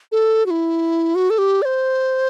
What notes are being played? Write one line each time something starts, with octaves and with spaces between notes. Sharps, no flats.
A4
F#4
E4
F#4
A4
G4
D5
C5